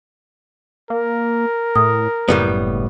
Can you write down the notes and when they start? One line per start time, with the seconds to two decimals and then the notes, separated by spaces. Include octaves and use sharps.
0.90 A#3 A#4
1.76 A2 D#6
2.29 F#1 A2 G3 B3